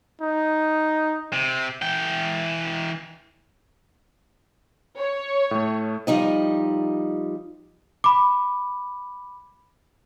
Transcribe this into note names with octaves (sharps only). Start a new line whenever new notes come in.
D#4
C3
E3 G5
C#5
A2 A3
F3 G3 D#4 D#5
B5 D6